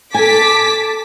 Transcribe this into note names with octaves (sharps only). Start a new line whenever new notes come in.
A4 G#5 A5 D6 B6